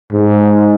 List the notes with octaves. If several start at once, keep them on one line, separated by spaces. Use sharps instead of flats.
G#2